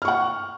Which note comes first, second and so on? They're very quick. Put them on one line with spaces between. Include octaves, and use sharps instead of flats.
F6 C#6 F#5